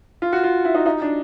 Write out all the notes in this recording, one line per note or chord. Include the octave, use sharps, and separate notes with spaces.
F4
F#4
F4
E4
D#4
D#4
D4